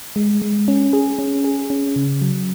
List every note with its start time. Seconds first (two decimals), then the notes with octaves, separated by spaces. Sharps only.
0.16 G#3
0.42 G#3
0.68 C#4
0.93 G#4
1.19 C#4
1.44 G#4
1.70 C#4
1.96 C#3
2.22 F#3